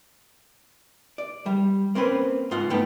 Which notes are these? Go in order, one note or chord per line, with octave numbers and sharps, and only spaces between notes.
D5
G3
A#3 C4 C#4 B4
G#2 F4 F#5
A3 B3 D#4 G5